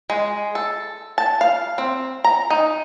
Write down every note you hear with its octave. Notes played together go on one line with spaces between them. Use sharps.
G#3
A4
A5
F5
C4
A#5
D#4